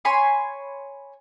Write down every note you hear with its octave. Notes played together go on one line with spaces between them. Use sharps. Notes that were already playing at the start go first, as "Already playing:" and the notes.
C#5 G#5 B5 C6